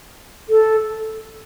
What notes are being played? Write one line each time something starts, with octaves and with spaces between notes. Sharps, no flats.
A4